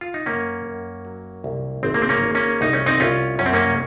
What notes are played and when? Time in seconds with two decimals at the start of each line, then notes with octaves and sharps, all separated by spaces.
0.01 F4
0.14 D#4
0.26 F#2 A#3 C#4
0.65 F#2
1.05 F#3
1.44 C2
1.83 G#1 C4
1.94 A#3
2.02 C4
2.09 A#3 C#4
2.22 G#1
2.35 A#3 C#4
2.61 C2 D#4
2.73 C#4
2.86 C4 D#4
3.00 C2 C#4 F4
3.39 F#2 C#4
3.46 C4
3.53 A#3 C#4